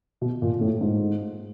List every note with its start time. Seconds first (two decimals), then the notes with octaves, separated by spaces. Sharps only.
0.21 B2
0.42 A#2
0.61 A2
0.81 G#2